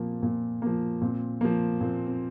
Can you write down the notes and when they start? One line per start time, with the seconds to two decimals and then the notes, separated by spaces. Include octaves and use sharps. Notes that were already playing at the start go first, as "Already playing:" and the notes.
Already playing: A#2 F3 A#3 C4
0.23 A#2
0.62 F3 A#3
1.02 A#2 C4
1.41 F3 A#3
1.81 A#2 C4
2.07 C4